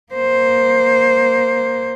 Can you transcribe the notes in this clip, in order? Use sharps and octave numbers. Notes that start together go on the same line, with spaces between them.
A#3 C5